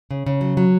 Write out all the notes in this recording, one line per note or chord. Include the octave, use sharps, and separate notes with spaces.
C#3
C#3
F#3
F#3